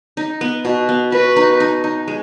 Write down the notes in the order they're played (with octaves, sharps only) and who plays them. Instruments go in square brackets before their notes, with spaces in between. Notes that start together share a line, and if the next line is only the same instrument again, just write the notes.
[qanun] D#4
B3
B2
B3
[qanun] F#4 [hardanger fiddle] B4
[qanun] D#4
D#4
D#4
G#3